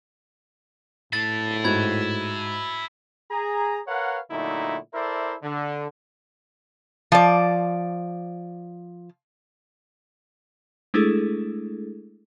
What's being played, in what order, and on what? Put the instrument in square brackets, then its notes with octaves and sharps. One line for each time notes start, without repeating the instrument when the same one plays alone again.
[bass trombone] A2 [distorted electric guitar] E4 A5 [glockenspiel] A6
[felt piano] G#2 F#4 [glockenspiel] B5 G#6
[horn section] G#4 A#5
A#4 B4 C#5 F5 F#5
A#2 D3 F#3 A3 D#4 E4
E4 A4 A#4 C5 D5 E5
D3
[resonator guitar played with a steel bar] F3 D5
[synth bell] G#3 A3 D4 E4 G#4 A4